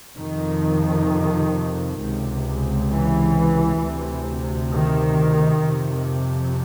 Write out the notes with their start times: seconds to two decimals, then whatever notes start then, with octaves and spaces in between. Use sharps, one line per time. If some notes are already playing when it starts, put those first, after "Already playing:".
0.19 F2 C3 D#3
2.00 C#2 C3
2.92 E3
3.82 D2 C3
4.73 D#3
5.62 F2 C3